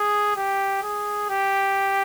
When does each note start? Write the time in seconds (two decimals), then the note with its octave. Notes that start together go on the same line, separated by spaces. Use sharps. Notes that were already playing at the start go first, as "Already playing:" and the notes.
Already playing: G#4
0.36 G4
0.83 G#4
1.29 G4